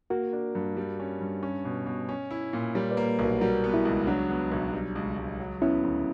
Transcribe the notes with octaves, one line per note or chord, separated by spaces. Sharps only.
A#3 F#4 A#4
D4
G2
G3
C#4
G2
C#4
B2
B2
C#4
E4
A#2
G3 A#4 C#5
B4 D5
A#3
B1
F#4 A#4
G3 F#4 A#4
B3
E4 G4
C#2
F#3 D4 F#4
B3
B1
G3
C#2
C#2
F#3
B3 C#4 E4
D2